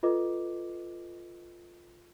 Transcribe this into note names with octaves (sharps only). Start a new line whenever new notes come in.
F4 A4 B4 D#5 D6